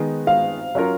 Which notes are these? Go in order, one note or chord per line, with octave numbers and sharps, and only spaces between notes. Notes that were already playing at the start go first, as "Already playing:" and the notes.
Already playing: D#3 G#3 B3 D#4
F5
F#3 C#4 F4 A#4 C#5